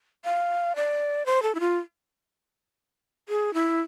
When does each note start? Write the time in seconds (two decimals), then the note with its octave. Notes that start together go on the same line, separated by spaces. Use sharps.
0.25 F5
0.76 D5
1.26 C5
1.43 A4
1.55 E4
1.60 F4
3.29 G#4
3.54 E4